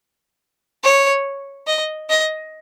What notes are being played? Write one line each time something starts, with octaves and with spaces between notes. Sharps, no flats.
C#5
D#5
D#5